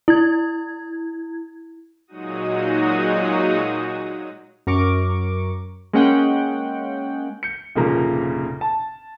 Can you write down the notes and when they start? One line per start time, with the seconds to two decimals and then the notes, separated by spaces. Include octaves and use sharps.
0.08 E4 G#6
2.07 A#2 F#3 G#3 D#4 F#4 D#6
4.67 F#2 A#4 C#6 D6
5.93 G#3 A#3 C#4 F#5 G5
7.43 G6 C#7
7.76 F1 A#2 C#3 F3 A#3 A#5
8.61 A5